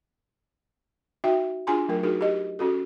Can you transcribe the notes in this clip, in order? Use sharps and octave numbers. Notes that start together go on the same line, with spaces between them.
D#4 F#4 E5 G5
D4 F4 G#4 G#5 A#5 C6
F#3 A3 A#4
D#4 F#4 G#4 A#4
G4 D#5
C#4 F#4 A4